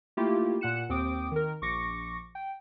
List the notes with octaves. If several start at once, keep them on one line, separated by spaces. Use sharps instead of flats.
A3 A#3 E4 F4 G4
A#2 F#5 F#6 C#7 E7
D#2 C4 G5 D6 D#6 D7
D#3 A#4
A#1 C#6 D6 A#6 C#7
G5